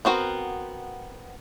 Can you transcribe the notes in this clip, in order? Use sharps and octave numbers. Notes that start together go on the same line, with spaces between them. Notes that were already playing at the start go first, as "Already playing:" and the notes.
B3 C4 F#4 A#4